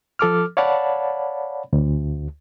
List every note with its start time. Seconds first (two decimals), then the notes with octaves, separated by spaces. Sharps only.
0.19 F3 A4 D6 F6
0.57 C#5 D5 F5 F#5 A5 B5
1.73 D2